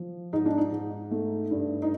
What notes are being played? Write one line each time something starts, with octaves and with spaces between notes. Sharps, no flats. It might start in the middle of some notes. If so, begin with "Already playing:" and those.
Already playing: F3
G#2 D#4
D4
D#4
G#2
A3
G2
D#4